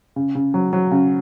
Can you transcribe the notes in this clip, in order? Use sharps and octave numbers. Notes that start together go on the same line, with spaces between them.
C#3
C#3
F#3
F#3
C#3